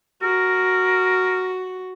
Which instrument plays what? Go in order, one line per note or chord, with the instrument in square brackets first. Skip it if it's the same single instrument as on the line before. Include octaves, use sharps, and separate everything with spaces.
[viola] F#4 [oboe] A#4